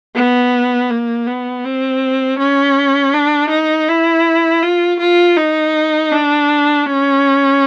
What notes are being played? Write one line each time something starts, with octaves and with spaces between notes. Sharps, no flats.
B3
A#3
B3
C4
C#4
D4
D#4
E4
F4
F4
D#4
D4
C#4